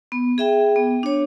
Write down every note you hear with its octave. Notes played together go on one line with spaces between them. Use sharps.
B3
G#4 E5 G5
B3
D4 C#5